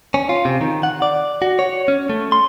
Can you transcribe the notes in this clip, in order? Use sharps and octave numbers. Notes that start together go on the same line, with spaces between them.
C#4
F4
C3
D#3
F#5
D5
F#4
C#5
C#4
A3
C6